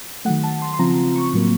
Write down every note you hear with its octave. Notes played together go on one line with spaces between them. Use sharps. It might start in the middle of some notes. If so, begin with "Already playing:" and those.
D#3 F#3 A3 F#5
A5
C6
C6
C#3 F3 C4 F4 A#5
C#6
A2 F#3 A#3